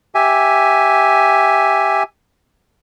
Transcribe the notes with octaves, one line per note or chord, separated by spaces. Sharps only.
G4 E5 G#5